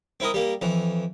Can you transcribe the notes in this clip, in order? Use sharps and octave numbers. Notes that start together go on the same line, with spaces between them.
C4 E4 A#4 D#5
G3 A#3
F2 E3